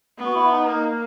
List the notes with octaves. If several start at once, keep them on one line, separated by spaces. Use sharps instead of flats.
B3
F#4
E4
D#4
A#3 D#4